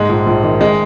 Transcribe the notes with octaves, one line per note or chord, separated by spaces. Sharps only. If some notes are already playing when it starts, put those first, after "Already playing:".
Already playing: G#2 G#3
A#1
A#1
D#3
G#3